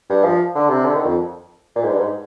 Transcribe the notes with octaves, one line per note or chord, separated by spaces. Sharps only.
G2
F3
D3
C3
D3
D#3
F2
A#2
G#2
G2
G#2